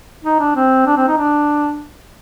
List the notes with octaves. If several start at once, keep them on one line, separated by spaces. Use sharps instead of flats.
D#4
D4
C4
D4
C4
D#4
D4